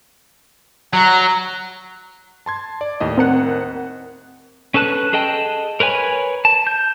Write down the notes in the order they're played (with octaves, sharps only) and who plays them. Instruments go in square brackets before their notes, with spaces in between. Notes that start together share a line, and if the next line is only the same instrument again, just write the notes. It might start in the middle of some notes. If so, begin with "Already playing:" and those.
[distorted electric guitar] F#3 [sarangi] A#5
[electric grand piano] A5 C6 G#6
D5
D#2 A2 D#5
[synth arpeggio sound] C4 A#4 F#5
[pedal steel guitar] C#4 A4 B4 A5 F#6
G#4 A4 D#5 G5 A5
A#4 B4 C#5 G#5 B5
A5
G6